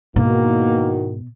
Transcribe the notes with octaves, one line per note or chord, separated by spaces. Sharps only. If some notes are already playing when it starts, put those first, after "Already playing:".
E2 G#2 B2 D#3 A#3 F#4